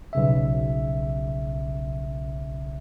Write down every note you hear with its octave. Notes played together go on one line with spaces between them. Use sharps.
B1 C#3 E5